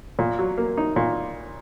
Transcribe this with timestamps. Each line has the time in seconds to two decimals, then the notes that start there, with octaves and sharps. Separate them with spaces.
0.19 A#2
0.39 F#3
0.58 A#3
0.77 D#4
0.96 A#2